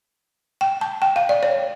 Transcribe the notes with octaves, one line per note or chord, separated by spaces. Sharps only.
G5
A5
G5
F5
D5
C#5